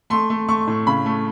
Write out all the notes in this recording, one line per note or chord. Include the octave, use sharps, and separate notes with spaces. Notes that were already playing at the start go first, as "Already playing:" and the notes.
A3 C6
A3
A3 C#6
A2
C#3 B5
A3